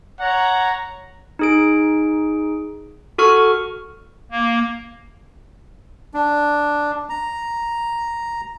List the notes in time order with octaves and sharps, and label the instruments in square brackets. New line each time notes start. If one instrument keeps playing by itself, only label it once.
[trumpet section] C#5 F#5 A#5
[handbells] D#4 G#4 D7
F#4 A4 C#6 F6
[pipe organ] A#3
[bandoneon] D4
A#5